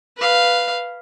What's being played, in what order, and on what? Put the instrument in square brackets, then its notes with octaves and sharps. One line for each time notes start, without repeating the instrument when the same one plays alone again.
[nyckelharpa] B4 F5